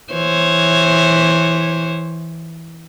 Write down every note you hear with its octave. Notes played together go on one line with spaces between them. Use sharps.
E3 C5 C#5